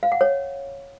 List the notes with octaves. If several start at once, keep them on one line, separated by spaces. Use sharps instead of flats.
F5
F#5
C#5